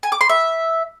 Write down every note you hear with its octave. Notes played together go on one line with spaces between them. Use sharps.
G#5
D6
C6
E5